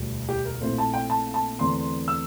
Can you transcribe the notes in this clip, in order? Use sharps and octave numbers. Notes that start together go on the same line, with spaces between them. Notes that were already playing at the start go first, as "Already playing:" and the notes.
Already playing: E1 D2 D3 G3
G4
A#4
A#1 A#2 A3 C4 E4 C5
A5
G5
A5
A5
E2 D3 A3 C4 C6
E6